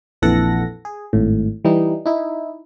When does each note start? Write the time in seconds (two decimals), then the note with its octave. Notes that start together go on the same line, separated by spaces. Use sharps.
0.22 A#1 F2 E3 A4 F#5 A#6
0.85 G#4
1.13 G#1 A2
1.65 E3 G3 D#4
2.06 D#4 E4